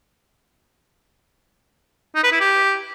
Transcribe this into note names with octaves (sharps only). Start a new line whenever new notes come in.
D#4
B4
E4
G4